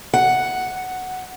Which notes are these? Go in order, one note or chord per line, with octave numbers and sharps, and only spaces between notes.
F#5